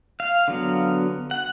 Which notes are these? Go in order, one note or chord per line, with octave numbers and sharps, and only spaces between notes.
F5
D3 F#3 B3
F#5